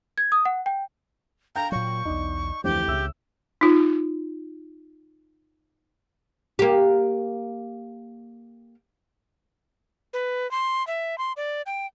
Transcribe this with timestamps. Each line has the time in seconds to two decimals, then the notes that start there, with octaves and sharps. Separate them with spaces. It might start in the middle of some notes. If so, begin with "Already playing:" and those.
0.18 G#6
0.32 D#6
0.45 F#5
0.66 G5
1.56 F5 G5 A#5 G6
1.72 A#2 F#3 C#6
2.05 B1 E2 D#4 D5 D6
2.64 F1 D2 E3 F3 G4
2.88 C#2 C#3 E5 E6
3.61 D#4 F4
6.59 A#3 G4
10.13 B4
10.51 C6
10.87 E5
11.18 C6
11.37 D5
11.66 G5